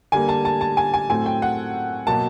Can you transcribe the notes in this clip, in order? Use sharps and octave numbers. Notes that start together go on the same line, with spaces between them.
D3 G3 A#3 G#5
A5
A5
A5
G#5
G#5
A2 F#3 A3 C4 G#5
G5
F#5
B2 F#3 A#3 A5